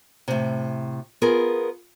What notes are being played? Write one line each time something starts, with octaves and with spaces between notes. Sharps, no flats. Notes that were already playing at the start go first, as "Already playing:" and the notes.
A2 C3
B3 F4 G#4 A#4